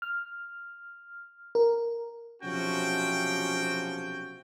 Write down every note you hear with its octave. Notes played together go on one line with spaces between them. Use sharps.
F6
A#4
B1 C3 F3 C#4 F#4 G5